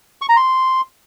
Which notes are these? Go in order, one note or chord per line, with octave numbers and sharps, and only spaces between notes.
C#6
A#5
C6